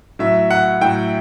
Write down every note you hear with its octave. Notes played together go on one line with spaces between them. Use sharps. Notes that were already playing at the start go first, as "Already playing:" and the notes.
A2 F#3 E5
F#5
A2 F#3 G5